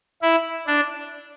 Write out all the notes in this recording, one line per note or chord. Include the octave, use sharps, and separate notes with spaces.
E4
D4